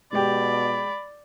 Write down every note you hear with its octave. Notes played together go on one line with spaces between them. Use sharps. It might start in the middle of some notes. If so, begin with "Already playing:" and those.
B2 G#3 G4 D5 B5